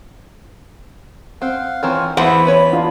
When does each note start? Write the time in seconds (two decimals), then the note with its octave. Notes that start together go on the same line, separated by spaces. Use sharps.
1.42 C4 F5 F#5
1.83 D#3 E3 C4 F4 A#4 C#5
2.17 E2 B3 E4 C5 F#5 B5
2.47 B4 C#5
2.73 D4 F4